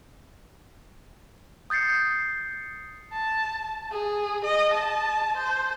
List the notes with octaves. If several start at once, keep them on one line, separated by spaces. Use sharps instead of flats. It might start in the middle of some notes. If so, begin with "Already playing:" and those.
D#6 G6 A6 C7 C#7
A5
G#4
D#5
A5
C5